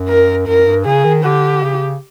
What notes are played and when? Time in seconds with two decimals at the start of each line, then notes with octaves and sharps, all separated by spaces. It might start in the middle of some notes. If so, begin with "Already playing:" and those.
Already playing: F#2
0.09 A#4
0.47 F#2 A#4
0.67 G2
0.85 C#3 G#4
1.05 D#3
1.24 D3 G4
1.63 C#3